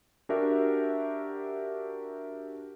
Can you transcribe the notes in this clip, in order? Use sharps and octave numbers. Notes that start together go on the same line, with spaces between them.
D4 F#4 G4 A#4 E5